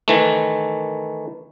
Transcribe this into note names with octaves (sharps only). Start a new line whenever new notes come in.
D#3 E3 A3